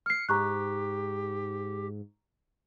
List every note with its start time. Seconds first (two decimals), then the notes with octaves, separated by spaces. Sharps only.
0.06 F6 C7 C#7
0.29 G#2 G4 A#5 C#6 F#6